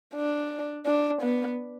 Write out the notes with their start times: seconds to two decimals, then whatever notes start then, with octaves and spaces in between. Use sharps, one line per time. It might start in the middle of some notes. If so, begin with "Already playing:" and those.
0.15 D4
0.86 D4
1.22 B3